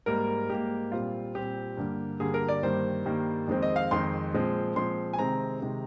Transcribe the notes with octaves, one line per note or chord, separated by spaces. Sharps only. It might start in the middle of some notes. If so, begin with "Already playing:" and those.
G#2 G3 A#3 A#4
G#2 G3 A#3 G4
A#2 G3 C4 F4
A#2 G3 C4 G4
G2 D3 G3 A#3
G2 D3 G3 A#3 G#4
A#4
D5
G2 D#3 G3 A#3 C5
G2 D#3 G3 A#3
F2 D#3 G#3 C4
D#5
F5
F2 D#3 G#3 C4 C6
A#2 F3 G#3 C4
A#2 F3 G#3 C4 C6
G#5
C3 D#3 G#3 C4 A#5
C3 D#3 G#3 C4